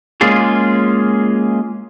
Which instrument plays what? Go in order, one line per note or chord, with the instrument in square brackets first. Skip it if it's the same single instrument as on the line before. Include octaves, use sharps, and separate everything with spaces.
[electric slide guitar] G#3 A#3 C#4 F4 G#4